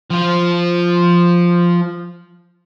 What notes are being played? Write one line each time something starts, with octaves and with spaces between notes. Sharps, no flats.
F3 F4